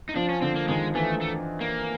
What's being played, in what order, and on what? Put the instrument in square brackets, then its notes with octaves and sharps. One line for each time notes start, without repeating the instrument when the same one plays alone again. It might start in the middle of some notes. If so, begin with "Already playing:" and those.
[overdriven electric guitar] D#4
[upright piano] F3 [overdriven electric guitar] D4
[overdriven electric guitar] C#4
[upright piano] D3 [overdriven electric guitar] C4
[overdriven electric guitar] A#3
[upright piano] D#3 [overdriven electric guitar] G#3
[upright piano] E3 [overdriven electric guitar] A3
[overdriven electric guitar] A3
A#3